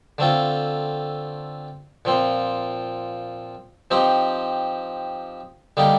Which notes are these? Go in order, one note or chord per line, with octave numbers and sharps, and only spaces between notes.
D3 A3 C4 F4
A#2 F3 C4
F3 C4 D#4 G4
D3 G3 A#3 D#4 G4